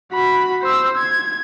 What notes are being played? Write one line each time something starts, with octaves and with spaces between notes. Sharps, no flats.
F#4 B5
C5 E6
G#6